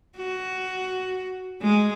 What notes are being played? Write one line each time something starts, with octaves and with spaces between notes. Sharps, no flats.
F#4
G#3